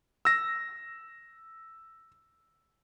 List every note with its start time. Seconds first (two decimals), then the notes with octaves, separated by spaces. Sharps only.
0.25 E6 A#6